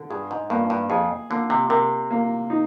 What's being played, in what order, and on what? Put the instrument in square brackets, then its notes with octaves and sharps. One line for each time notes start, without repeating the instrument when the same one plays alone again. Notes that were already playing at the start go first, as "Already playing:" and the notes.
Already playing: [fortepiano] D3
[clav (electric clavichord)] G2 [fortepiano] G#4
[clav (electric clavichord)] G#2
[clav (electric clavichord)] G2 [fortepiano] A#3
[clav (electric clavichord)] G2
[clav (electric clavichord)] F2 [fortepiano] G#4
[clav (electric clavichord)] D3 [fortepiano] A#3
[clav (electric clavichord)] C3
[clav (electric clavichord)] C3 [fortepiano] A#4
[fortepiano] A#3
D#4